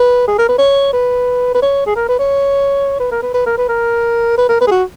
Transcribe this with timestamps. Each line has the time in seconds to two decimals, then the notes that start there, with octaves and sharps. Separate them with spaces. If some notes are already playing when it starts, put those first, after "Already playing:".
Already playing: B4
0.27 G#4
0.38 A#4
0.48 B4
0.58 C#5
0.93 B4
1.55 B4
1.62 C#5
1.86 G#4
1.96 A#4
2.08 B4
2.19 C#5
3.00 B4
3.11 A#4
3.22 B4
3.34 B4
3.46 A#4
3.58 B4
3.69 A#4
4.37 B4
4.49 A#4
4.61 B4
4.67 G#4
4.71 F#4